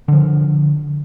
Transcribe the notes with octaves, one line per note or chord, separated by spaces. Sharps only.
D3 F3